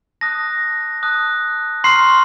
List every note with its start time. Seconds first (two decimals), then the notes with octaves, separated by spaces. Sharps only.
0.21 A5 D#6 F#6 A#6
1.03 A5 D#6 F#6
1.84 A#5 C6 C#6 F6 C7